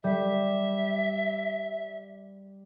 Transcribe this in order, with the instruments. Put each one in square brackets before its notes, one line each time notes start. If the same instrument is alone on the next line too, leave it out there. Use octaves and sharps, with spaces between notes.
[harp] G3 [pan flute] E5